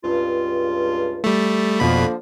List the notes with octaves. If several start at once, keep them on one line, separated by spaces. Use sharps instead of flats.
C#2 G2 F4
G3 A3
F2 B2 D3 F3 A#3 B5